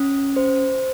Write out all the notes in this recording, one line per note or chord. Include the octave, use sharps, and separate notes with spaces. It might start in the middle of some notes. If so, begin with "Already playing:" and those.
Already playing: C#4
C5